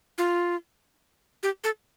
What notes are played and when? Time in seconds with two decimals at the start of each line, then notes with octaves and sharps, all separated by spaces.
0.18 F4
1.43 G4
1.64 A4